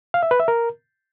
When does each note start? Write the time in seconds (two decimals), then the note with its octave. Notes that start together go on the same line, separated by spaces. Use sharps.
0.14 F5
0.23 E5
0.31 B4
0.40 E5
0.48 A#4